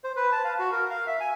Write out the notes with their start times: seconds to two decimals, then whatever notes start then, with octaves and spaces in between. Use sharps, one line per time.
0.04 C5
0.16 B4
0.32 A5
0.44 F5
0.59 F#4
0.72 A#4
0.90 F5
1.07 E5
1.20 G#5